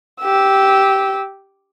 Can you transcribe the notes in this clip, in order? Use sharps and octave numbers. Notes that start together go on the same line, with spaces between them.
G4 E6